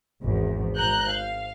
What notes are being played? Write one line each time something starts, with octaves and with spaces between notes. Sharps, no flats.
G#1 E2
G#1 A#5 F#6 G6
F5